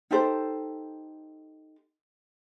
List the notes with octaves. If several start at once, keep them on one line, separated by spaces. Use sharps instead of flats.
D#4 G4 A4 C5